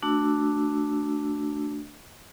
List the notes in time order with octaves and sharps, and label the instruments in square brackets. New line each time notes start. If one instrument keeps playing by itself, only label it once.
[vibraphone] A3 D4 F#4 E6